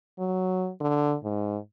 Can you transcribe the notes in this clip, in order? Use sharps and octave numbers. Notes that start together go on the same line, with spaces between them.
F#3
D3
G#2